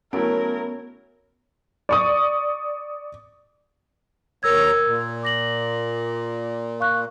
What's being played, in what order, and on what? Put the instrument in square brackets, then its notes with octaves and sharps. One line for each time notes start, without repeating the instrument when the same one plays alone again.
[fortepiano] F#3 A3 E4 [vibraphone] B3 [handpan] C#4 [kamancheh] A#4
[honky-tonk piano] D5 C#6 D#6
[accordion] D#2 C#5 A#5 [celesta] A#4 E6 G#6
[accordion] A#2
[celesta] D6 A#6 F#7
F5 C#6 F#6